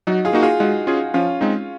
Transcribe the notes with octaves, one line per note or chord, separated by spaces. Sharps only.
F#3 D#4 F#4
F4 G#4
A#3 D#4 F#4
F4 G#4
G#3 D#4 F#4
C#4 F4 G#4
F3 C#4 F4
G#3 C4 D#4